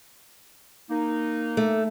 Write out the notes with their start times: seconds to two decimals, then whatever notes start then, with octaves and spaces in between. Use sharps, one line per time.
0.90 A#3 D#4
1.57 A3